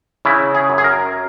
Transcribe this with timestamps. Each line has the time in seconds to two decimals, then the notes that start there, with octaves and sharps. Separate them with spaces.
0.25 C#3 E4
0.55 G#4
0.70 F#2
0.78 G#4
0.84 A#4